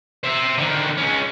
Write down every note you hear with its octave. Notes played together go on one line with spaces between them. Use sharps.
C5 E5
D3 D#3
G#3 C#4